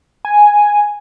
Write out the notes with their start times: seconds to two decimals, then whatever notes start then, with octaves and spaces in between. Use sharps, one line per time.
0.25 G#5